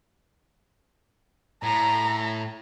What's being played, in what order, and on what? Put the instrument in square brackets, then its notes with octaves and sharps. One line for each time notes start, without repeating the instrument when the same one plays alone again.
[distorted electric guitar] A2 [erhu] A#5